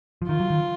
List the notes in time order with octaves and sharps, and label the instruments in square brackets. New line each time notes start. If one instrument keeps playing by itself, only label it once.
[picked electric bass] F3
[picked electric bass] D#3 [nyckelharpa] F4
[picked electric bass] F#3
D#3